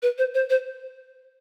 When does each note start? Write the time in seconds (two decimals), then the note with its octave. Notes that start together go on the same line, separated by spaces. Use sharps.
0.02 B4
0.18 C5
0.35 C5
0.50 C5